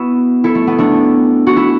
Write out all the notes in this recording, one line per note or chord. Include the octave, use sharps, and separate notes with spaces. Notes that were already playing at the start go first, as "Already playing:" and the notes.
Already playing: B3 E4 F#4
E4 A4
A3
B3
A3 D4
F#4
E4